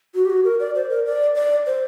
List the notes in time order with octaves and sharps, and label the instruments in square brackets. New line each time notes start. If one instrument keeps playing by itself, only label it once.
[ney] F#4
G4
F#4
A#4
D5
C5
A#4
D5
D5
C5